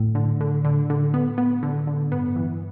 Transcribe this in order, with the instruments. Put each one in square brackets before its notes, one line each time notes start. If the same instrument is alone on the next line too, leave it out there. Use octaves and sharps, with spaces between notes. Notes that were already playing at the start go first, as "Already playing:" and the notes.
Already playing: [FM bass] A2
[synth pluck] D3
D3
D3
D3
B3
B3
D3
D3
[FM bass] G2 [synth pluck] B3
[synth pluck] E3